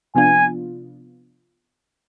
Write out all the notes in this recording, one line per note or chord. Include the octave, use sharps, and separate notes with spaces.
C3 F3 B3 D4 F4 G#5